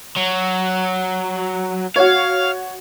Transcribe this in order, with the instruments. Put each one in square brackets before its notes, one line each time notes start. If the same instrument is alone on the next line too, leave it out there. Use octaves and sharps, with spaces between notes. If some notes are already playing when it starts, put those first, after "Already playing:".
[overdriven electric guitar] F#3
[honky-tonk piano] F#4 C#5 [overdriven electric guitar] F5